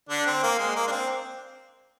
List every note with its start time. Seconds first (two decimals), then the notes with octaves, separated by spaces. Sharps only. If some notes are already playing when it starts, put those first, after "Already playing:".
0.09 D3 D4
0.26 C4
0.43 A#3
0.59 G#3
0.76 A#3
0.87 D4
0.92 C4